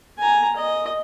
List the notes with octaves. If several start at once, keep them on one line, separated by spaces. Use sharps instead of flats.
G#5 A#5
D#5